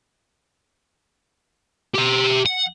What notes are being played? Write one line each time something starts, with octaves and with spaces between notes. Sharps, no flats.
G4 E5
F#5